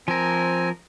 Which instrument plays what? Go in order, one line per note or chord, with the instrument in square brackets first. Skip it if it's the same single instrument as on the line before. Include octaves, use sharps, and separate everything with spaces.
[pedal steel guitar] F3 A#4 [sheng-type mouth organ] C4 G#5